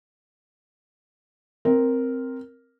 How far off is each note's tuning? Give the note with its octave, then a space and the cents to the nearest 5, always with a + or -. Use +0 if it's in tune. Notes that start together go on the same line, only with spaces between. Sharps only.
C4 +0 A#4 +0